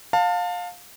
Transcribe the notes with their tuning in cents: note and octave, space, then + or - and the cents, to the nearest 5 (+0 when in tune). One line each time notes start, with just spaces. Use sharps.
F5 +20 A5 +25